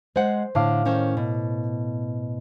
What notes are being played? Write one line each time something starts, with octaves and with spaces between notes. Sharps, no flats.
G#3 C5 F#5
A2 D3 F5 D6
D#3 C#4 C5
B2